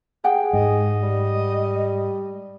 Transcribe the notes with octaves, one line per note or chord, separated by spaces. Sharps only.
G4 G#4 F#5 G5
G#2 D#5
G3